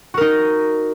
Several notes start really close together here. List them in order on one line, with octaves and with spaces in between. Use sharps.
F#4 A#4 D#4